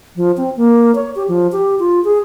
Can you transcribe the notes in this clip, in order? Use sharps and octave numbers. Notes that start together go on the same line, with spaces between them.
F3
C4
A#3
C#5
G4
F3
G4
F4
G#4